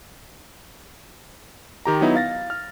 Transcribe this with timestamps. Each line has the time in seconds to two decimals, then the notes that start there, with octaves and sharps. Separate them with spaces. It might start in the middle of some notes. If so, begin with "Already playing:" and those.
1.85 D#3 G4 A#5
2.01 F#3 B3 D#4 E4
2.15 F5 A6 A#6
2.50 F6